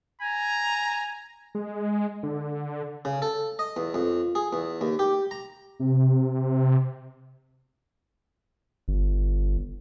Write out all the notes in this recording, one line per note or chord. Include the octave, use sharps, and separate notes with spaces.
G#5 A#5
G#3
D3
C#3
A4
D#5
E2
F2
G#4
E2
D#2
G4
A#5
C3
G1